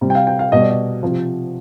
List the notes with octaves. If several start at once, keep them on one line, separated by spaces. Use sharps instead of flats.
C3 G3
G5
F5
G5
F5
B2 G3 D#5
D5
D#5
C3 F3